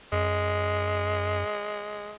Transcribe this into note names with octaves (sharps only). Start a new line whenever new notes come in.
F#2 G#3